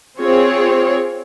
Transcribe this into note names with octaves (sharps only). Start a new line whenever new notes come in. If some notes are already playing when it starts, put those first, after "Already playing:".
C4 F4 G#4 C#5